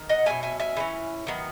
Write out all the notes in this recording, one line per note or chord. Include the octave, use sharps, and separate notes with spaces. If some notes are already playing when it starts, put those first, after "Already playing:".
Already playing: D#3
D#5 F#5
B2 F#3 A#3 C#4 E5 G#5
E5 G#5
E5 G#5
E3 G#3 C#4
D#3 F#3 B3